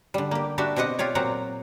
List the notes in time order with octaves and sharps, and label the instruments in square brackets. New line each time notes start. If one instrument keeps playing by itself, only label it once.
[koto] D3 G3
A#3 G4
G3 D4 F#4 G4 E5
B2 C4 G4 D#5 F#5
F4 G4 C#5 D5
A#2 F#3 C4 G4 F#5 A#5